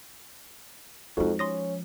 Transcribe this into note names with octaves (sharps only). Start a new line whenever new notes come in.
F2 F3 G#3 D#4 F#4
C#4 C6 D#6 A#6